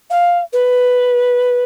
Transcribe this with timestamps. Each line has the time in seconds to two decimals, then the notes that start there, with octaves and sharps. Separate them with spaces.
0.10 F5
0.52 B4